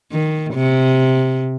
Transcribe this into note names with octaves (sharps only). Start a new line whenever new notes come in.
D#3
C3